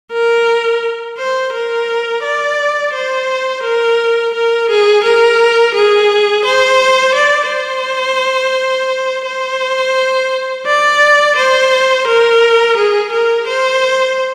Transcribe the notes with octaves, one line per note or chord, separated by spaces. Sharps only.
A#4
C5
A#4
D5
C5
A#4
A#4
G#4
A#4
G#4
C5
D5
C5
C5
D5
C5
A#4
G#4
A#4
C5